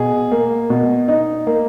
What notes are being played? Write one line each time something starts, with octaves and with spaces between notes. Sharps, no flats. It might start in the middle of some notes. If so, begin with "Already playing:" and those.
Already playing: B2 G#4
A#3
B2
D#4
A#3